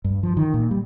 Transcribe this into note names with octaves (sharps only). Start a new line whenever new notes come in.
G2
F3
D#3
A#2
G3